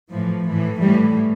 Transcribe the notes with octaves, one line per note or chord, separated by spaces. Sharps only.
A2 E3 F3
A2 E3
A2 E3 G3